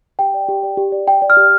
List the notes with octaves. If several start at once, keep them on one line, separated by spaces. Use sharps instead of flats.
G4 G5
D5
G4
D5
G4
D5
G4 G5
D5
F6
G4